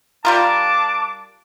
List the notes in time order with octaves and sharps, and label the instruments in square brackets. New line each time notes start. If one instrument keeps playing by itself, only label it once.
[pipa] G3 F4 A#4 [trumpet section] D4 A5 D6